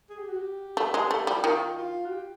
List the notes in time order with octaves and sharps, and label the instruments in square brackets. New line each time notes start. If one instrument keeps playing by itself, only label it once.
[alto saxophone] G#4
G4
F#4
G4
[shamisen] A3
G#3
A3
G3
[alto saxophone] E4
[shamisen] D#3 [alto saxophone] F4
[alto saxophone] F4
F#4
G4